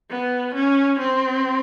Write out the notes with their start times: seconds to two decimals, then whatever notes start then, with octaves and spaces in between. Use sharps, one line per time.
0.10 B3
0.54 C#4
0.99 C4